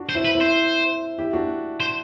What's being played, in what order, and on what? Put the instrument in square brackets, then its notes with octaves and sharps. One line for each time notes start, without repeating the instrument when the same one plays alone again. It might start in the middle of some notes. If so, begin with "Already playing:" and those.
Already playing: [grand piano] D4 F#4
[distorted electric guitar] C5
[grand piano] C4 E4
[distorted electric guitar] B4
[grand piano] C4 E4
[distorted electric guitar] C5
[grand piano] E4 G4
D4 F#4
[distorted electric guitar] C5